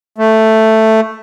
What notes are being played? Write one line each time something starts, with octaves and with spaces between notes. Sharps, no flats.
A3